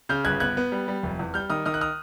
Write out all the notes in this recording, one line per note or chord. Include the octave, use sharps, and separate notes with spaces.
C#3 F6 G6
G1 F#6 G#6
B3 F#6 G#6
B3
G3
G3
F1
E2
G3 F6 G6
D#3 D#6 F6
D#3 D#6 F6
F#6
D#6 F6